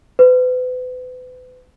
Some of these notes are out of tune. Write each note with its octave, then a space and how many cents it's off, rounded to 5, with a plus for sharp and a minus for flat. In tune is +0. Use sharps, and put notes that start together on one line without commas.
B4 +35